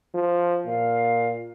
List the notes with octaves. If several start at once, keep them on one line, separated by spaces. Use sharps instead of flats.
F3
A#2 F5